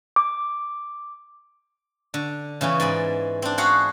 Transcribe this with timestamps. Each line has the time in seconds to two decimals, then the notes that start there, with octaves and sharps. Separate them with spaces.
0.16 D6
2.14 D3
2.61 C#3 E3 B3 C#4
2.80 G#2 D5 G#5 B5
3.42 C4 D4
3.58 F#4 G#4 F5 F#5 B5